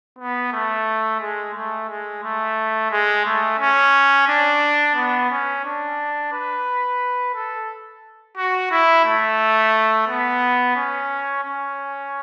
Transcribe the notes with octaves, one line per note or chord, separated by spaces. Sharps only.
B3
A3
G#3
A3
G#3
A3
G#3
A3
C#4
D4
B3
C#4
D4
B4
A4
F#4
E4
A3
B3
C#4
C#4